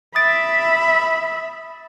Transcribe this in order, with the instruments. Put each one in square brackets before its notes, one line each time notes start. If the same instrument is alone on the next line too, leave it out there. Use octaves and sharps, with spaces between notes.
[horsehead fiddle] E5 B5 [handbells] D#6 A6 D7